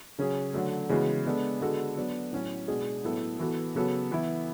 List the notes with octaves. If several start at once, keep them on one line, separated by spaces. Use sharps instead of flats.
C#3 F#3 C#4 G#4
D3 F#3 A3
C#3 E3 G#3 B3 F#4
G#3 B3 D4 A4
D3 G#3 B3 F#4 A4
F#3 B3 D4
A2 F#3 C#4 F#4
B2 G#3 D4 G#4
A2 F#3 B3 E4 A4
E3 B3 F#4 A4
C#3 F#3 B3 F#4 A4
E3 B3 E4